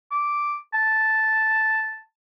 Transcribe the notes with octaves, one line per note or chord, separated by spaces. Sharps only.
D6
A5